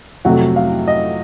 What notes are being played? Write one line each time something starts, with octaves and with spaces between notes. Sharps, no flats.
F2 C3 F#3 A3 F#5
F5
D#5